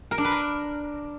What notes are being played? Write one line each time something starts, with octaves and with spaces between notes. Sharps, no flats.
A#4
D4
B4
A#4